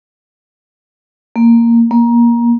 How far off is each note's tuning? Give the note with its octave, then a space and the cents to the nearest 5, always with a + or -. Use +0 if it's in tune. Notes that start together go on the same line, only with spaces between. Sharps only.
A#3 -5
A#3 +20